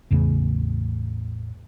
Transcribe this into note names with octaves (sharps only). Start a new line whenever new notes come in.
A1 E2 C#3 A3